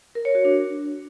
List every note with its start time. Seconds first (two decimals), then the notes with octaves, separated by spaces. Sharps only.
0.15 A#4
0.25 C#5
0.35 F#4
0.45 D4